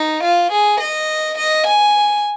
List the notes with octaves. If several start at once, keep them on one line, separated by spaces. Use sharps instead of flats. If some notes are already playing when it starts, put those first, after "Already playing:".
Already playing: D#4
F4
G#4
D#5
D#5
G#5